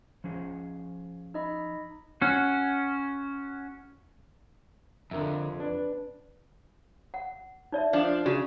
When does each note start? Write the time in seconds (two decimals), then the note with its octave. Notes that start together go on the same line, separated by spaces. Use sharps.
0.24 F3 C#4 G#4
1.34 D#4 D#5 B5
2.21 C#4 F#4
5.11 F2 D3 A#4 E5
5.60 D4 B4
7.14 F#5
7.72 D#4 D5 E5
7.93 F3 D4
8.26 C#3 F#4